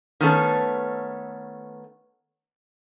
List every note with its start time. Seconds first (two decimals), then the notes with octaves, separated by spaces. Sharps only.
0.21 D#3 A3 B3 C#4 A4